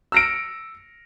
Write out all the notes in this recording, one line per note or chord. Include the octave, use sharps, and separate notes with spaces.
E6 F6 A#6 C#7 D7